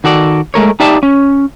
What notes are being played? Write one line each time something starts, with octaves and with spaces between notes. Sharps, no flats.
D#3 F#4 A4 D5
G#3 A3 A#4 C#5
D#4 G4 D5 E5 A5
C#4